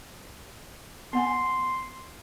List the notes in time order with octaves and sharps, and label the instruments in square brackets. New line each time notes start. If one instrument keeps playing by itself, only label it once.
[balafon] B3 F#5 G#5 [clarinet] C6